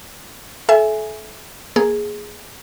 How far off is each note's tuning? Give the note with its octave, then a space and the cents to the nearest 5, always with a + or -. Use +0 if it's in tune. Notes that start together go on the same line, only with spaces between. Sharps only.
A4 -35 E5 +0 G#5 +0
A#3 +0 G#4 +0